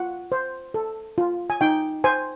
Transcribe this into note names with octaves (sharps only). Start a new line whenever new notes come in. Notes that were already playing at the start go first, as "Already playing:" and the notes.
Already playing: F4 F#5
C5
A4
F4
G#5
D#4 G5
C5 G#5